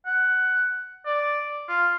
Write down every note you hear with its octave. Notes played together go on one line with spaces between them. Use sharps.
F#5
D5
F4